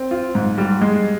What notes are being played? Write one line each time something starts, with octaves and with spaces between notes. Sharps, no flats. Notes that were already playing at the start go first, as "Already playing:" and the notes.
Already playing: C4
F4
G#2
G3
G#3